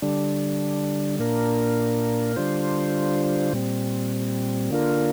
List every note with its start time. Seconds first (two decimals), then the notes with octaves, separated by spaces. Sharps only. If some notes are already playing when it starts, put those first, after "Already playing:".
0.02 D3 G3 D4
1.19 A#2 A#3 D4 A#4
2.36 D3 G3 D4 F4 C5
3.53 A#2 G3 C4
4.70 D3 A#3 D4 F4 A#4